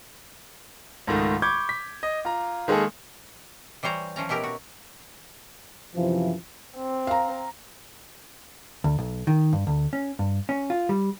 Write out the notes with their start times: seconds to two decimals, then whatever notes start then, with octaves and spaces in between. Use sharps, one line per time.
1.07 C#2 G#2 D#3 A3
1.42 B5 C#6 D6 G6 G#6
1.69 B6
2.03 D#5
2.25 F4 A#5
2.68 D#3 G#3 A#3 G#4 A4
3.83 E3 G3 C5 C#5 A#5
4.16 E3 F3 C#4 A#5
4.29 B2 D#4 E4 G4 A#4
4.43 F#4
5.95 F#2 C3 E3 F3
6.77 C4
7.07 F5 A#5
8.84 D2
8.99 B1
9.27 D#3
9.53 G2
9.67 D2
9.93 C#4
10.19 G2
10.49 C#4
10.70 F4
10.89 G3